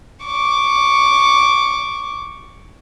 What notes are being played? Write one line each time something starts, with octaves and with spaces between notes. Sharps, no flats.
C#6 D6